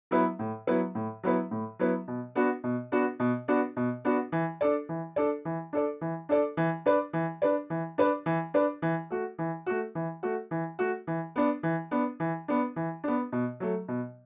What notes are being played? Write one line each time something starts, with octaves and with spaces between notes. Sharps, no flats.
F#3 B3 E4 B4
A2
F#3 B3 E4 B4
A2
F#3 B3 E4 B4
A2
F#3 B3 E4 B4
B2
B3 D4 F#4
B2
B3 D4 F#4
B2
B3 D4 F#4
B2
B3 D4 F#4
E3
D4 A4 D5
E3
D4 A4 D5
E3
D4 A4 D5
E3
D4 A4 D5
E3
D4 B4 D5
E3
D4 B4 D5
E3
D4 B4 D5
E3
D4 B4 D5
E3
A3 F#4
E3
A3 F#4
E3
A3 F#4
E3
A3 F#4
E3
B3 D4
E3
B3 D4
E3
B3 D4
E3
B3 D4
B2
F#3 A3
B2